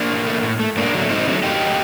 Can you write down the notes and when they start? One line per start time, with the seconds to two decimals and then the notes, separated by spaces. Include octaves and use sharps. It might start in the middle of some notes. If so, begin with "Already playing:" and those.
Already playing: A#3 D4
0.10 A2
0.27 A3
0.43 A2
0.59 A3
0.76 G2 A#3 D4
0.94 D3 F#3 A3
1.09 G2 C4 D#4
1.27 D3 F#3 A3
1.43 G2 D#4 G4
1.59 D3
1.62 F#3 A3